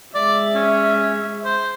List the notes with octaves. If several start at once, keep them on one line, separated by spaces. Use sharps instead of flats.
G#3 D5 E5
C#4
C5